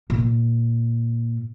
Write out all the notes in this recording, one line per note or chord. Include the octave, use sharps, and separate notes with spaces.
A#2